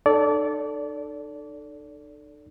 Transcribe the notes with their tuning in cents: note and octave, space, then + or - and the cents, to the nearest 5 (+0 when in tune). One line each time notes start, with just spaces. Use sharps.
D#4 -45 A4 +0 D5 -25